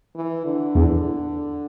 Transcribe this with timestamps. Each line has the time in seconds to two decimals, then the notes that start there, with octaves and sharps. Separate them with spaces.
0.15 E3
0.45 D3
0.75 E2